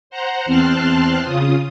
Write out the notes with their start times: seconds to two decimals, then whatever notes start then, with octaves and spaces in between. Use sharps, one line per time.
0.10 C5 F#5 A#5
0.46 E2 C4 A5 C6 F6 F#6
1.24 C#3 F4 D#6